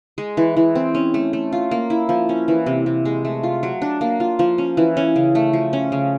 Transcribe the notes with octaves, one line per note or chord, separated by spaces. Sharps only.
G#3
E3
E3
C4
C#4
A3
A3
F4
A#3
E4
F3
C#4
E3
C3
C3
G#3
A3
F4
F#3
D4
A#3
F4
F3
C#4
E3
C#4
C#3
A3
F3
C#4
C#3